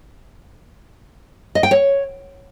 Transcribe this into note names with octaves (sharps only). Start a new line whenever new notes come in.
D#5
G5
C#5